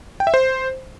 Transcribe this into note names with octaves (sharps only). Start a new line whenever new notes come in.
G5
E5
C5